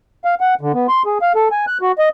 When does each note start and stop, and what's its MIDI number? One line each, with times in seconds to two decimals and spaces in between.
0.25 0.35 77
0.41 0.54 78
0.61 0.72 50
0.74 0.87 59
0.88 1.03 84
1.06 1.18 68
1.22 1.33 77
1.35 1.48 69
1.51 1.65 80
1.67 1.78 90
1.81 1.92 66
1.99 2.09 75